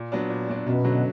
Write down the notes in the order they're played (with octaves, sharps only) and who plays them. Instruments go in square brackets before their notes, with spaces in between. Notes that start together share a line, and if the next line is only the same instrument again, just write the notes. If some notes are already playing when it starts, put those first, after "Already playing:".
Already playing: [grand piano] A#2
F#3 B3 D4
A#2
F#3 B3 D4
[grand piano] F#2 [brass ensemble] B2
[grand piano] D3 F#3